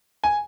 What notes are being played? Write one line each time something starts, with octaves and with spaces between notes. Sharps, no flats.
G#5